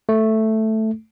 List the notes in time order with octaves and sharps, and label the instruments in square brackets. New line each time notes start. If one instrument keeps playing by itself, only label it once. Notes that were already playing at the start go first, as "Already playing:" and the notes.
[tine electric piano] A3